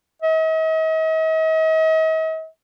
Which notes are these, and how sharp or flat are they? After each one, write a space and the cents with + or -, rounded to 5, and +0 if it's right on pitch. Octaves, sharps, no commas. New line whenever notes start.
D#5 +45